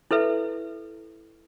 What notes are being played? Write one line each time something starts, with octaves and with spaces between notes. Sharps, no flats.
E4 A4 B4 E5